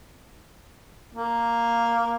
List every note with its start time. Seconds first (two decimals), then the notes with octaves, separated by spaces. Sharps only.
1.15 A#3